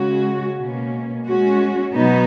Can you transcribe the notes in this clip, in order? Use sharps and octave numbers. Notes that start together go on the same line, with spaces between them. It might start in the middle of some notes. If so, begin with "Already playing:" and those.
Already playing: C#3 G#3 C#4 F#4
B2 A#3 C#4
G#3 C#4 F#4
B2 F#3 B3 D#4